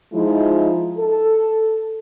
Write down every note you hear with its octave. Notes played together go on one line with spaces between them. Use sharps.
F3 G#3 D#4 E4
A4